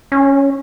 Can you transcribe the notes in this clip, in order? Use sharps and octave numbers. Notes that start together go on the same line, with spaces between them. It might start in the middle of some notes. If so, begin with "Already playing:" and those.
C#4